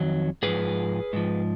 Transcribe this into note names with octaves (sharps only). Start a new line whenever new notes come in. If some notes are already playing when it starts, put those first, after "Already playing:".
Already playing: F2 D#3 F#3
G#2 F3 G#4 B4
G#2 F3